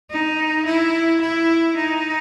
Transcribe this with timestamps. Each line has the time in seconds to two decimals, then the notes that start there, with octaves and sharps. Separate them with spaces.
0.11 D#4
0.65 E4
1.20 E4
1.75 D#4